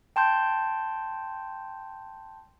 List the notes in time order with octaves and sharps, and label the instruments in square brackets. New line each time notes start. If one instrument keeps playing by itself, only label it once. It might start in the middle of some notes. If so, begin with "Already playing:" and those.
[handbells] G5 A5 C6 G6